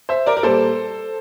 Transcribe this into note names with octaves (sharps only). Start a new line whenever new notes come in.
C5 E5
A#4 D5
A#4
A#2 G3 A#3 A4 C5